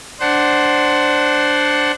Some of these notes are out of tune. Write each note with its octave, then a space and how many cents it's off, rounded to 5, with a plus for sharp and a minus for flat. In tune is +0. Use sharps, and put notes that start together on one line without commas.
D4 +0 C5 +0 F#5 +15